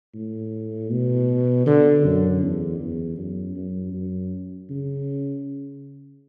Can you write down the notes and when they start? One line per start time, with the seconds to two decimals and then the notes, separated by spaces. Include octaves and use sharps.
0.15 A2
0.90 B2
1.67 D3
2.05 F#2
2.43 E2
2.80 E2
3.18 F#2
3.56 F#2
3.94 F#2
4.70 C#3